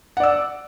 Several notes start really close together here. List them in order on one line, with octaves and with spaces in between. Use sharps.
F#5 D5 E6